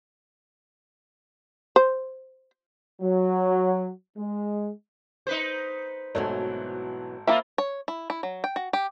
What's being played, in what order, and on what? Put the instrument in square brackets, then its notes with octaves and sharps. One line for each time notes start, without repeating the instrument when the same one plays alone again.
[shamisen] C5
[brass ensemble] F#3
G#3
[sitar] D#4 B4 C5
[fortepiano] G#1 A3 C#5 [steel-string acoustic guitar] B2 E3 F#3
[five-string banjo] A#3 A#4 E5 [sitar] C4 F4 [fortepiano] B5
[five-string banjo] C#5
E4
E4
F#3
G5
F#4
G4